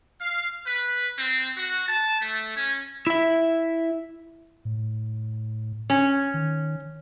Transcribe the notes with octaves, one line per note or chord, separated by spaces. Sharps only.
F5
B4
C4
F#4
A5
A3
C#4
E4 E5
A2
C#4
D#3